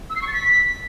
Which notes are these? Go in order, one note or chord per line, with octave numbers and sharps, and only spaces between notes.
E6
C7
C#6
A6
B6